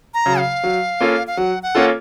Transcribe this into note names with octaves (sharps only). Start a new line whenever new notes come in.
A#5
C#3 F#3
F5
F#3
A#3 C#4 F4 A4
F5
F#3 F#5
F#5
A#3 C#4 F4 A4